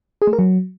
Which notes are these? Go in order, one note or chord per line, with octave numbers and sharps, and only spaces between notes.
G#4
A3
A#4
F#3